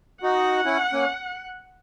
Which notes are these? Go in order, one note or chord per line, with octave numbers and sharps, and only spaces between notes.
D#4 F#4 F#5
C#4 E4
A#3 C#4